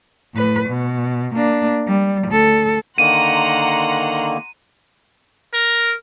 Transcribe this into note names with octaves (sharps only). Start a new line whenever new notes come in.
A2 B4
B2
A#3 D4
G3
D2 A4
D3 D#3 A#3 F#5 A#5 C6 D#7
A#4